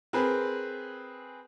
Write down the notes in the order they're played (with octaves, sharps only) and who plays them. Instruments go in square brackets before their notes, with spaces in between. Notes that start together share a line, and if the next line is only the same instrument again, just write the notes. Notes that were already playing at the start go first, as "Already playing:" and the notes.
[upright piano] C4 G#4 A#4 B4